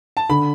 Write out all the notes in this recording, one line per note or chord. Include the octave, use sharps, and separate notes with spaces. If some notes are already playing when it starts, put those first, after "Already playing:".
A5
D3 B5